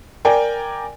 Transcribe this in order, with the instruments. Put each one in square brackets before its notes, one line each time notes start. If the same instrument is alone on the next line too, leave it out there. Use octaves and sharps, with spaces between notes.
[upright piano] A#4 D5 G5 G#5